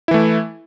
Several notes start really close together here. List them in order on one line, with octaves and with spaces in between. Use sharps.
E4 E3 A3